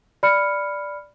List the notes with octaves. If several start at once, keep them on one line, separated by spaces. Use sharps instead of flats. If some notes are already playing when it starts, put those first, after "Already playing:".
D5 B5 F6 C#7